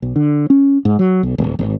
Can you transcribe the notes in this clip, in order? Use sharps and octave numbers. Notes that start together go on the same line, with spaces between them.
B1
D3
C#4
G#2
F#3
B1
D1
G#1